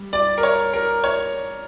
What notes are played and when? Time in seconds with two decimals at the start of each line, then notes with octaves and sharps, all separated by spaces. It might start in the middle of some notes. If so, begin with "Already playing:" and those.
Already playing: G3
0.13 D5
0.38 A#4
0.43 C#5
0.74 A#4
1.04 C#5